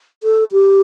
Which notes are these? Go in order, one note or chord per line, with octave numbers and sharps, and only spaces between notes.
A4
G4